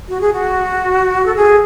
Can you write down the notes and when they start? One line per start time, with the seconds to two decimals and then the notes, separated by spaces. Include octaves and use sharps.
0.09 F#4
0.21 G#4
0.33 F#4
1.26 A4
1.36 G#4